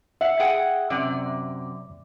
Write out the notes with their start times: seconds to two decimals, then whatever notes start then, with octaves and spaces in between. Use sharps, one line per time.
0.21 E5 F#5
0.40 G#4 F#5 G5
0.90 F#2 C3 D5